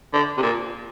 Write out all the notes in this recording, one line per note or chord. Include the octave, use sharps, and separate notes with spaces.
D3
C3
A#2